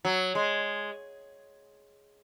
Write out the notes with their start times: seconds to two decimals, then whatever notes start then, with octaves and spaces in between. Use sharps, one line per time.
0.05 F#3
0.35 G#3